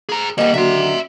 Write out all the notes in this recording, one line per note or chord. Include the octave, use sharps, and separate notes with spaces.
G#4 A#5
G3 A#3 D#5 F#5
D#2 D3 F#3 E5 C6